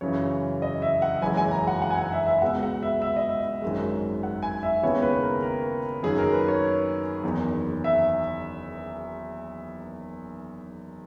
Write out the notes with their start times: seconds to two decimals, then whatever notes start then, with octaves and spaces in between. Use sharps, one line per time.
0.01 F#2 C#3 E3 C#5
0.62 D#5
0.82 E5
1.02 F#5
1.22 F#1 F#2 E3 G#3 G#5
1.37 G#5
1.51 A#5
1.67 F#5
1.82 F#5
1.91 G#5
1.98 F#5
2.12 E5
2.27 E5
2.42 C#2 B2 G#3 F#5
2.63 F#5
2.83 E5
3.02 E5
3.16 D#5
3.29 E5
3.62 G#1 F#2 D#3 G#3
4.23 F#5
4.43 G#5
4.63 E5
4.83 D#2 C#3 G#3 B3 E4 C#5
5.02 B4
5.22 A#4
5.43 A#4
6.03 F#2 D#3 A#3 D#4 G#4
6.18 A#4
6.33 B4
6.48 C#5
7.23 F#1 E2 D#3
7.84 E5